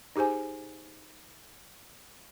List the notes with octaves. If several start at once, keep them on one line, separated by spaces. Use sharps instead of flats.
D#4 G4 G#4 C5 G#5